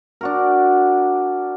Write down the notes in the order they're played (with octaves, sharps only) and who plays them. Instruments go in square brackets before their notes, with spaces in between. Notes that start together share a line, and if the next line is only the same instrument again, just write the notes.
[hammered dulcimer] D4 F#4 A#4